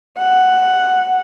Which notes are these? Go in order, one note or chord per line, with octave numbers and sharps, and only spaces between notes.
F#5